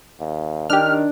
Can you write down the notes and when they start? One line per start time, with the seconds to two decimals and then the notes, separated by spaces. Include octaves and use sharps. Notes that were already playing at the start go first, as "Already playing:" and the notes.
0.21 D#2
0.70 D#3 D4 G4 F6